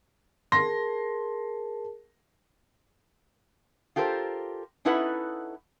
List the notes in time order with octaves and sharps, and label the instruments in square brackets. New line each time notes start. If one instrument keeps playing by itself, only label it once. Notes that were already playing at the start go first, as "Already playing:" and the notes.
[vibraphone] G#4 A#4 A5 [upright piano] C6 A#6
[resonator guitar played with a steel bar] F4 G4 A4 A#4 C5
C#4 D#4 E4 A4 B4 F#5